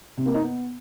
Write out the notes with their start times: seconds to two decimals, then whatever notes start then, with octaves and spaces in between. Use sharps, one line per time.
0.17 C3
0.26 A#3
0.34 D#4
0.43 B3